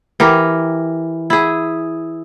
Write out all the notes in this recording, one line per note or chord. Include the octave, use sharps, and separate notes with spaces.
E3 G4 A#4
E4 G#4